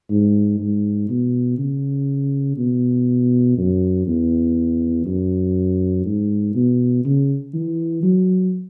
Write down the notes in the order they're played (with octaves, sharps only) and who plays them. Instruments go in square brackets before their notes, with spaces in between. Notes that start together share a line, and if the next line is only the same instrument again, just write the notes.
[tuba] G#2
G#2
B2
C#3
B2
F#2
E2
F#2
G#2
B2
C#3
E3
F#3